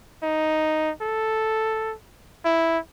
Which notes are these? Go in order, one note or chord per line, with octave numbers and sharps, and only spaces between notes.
D#4
A4
E4